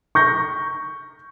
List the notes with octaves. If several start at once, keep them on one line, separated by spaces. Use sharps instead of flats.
C#6 G6 A#6